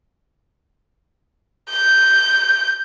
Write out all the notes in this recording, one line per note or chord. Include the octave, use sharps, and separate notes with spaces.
G6